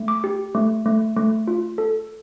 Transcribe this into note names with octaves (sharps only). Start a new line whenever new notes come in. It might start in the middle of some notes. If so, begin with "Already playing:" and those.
Already playing: A3
D6
G4
A3
A3
A3
F4
A4